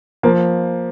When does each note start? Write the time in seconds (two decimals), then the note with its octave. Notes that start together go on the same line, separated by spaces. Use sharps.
0.23 F3 A#3